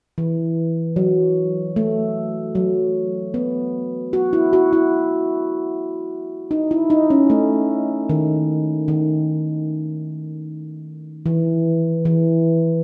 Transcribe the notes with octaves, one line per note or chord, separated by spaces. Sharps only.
E3
F#3
A3
F#3
B3
F#4
E4
F#4
E4
D#4
E4
D#4
C#4
A3
D#3
D#3
E3
E3